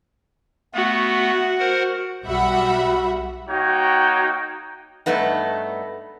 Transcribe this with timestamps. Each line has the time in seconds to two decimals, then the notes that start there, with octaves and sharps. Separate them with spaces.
0.74 A3 B3 F#4
1.59 A#4 C5 F#5
2.24 B1 G3 F#4 E5 F#5 B5
3.49 A#3 D#4 F#4 C#5 G5
5.06 G2 A3 B3 D#4